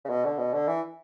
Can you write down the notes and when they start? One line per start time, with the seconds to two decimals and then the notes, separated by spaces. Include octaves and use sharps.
0.05 C#3
0.09 B2
0.24 D3
0.38 B2
0.53 D3
0.68 E3